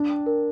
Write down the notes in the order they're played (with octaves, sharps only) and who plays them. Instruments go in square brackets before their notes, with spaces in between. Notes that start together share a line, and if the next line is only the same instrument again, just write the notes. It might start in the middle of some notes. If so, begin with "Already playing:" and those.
Already playing: [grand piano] D4
[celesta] G5
A#4